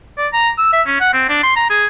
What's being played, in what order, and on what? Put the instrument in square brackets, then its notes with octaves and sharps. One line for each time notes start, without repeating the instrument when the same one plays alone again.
[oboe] D5
A#5
E6
E5
C#4
F#5
C4
D4
C6
A#5
G#4